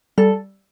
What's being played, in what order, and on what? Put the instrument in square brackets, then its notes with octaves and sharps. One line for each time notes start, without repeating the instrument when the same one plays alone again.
[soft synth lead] G3 [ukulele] A4